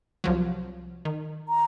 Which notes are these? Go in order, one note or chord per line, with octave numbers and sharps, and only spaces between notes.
C2 F3 F#3
D#3
A#5